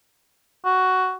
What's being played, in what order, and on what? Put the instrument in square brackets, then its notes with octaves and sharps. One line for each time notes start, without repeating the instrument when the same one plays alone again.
[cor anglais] F#4